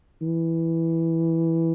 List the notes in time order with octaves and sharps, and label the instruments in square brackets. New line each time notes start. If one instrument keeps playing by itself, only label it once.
[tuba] E3